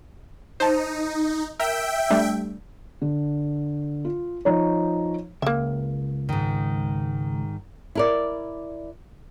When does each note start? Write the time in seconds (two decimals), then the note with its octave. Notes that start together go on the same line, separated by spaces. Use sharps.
0.60 D#4 C5 A5
1.60 A#4 E5 G5
2.10 G3 A3 D4
3.02 D3
4.05 F4
4.45 F3 D#4 C#5
5.42 C#2 A#3 E5
6.29 G#2 D#3
7.95 E4 A#4 D5